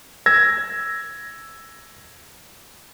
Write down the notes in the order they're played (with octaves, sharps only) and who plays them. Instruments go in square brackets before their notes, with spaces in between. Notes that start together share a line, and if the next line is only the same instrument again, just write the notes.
[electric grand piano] E6 G#6 A#6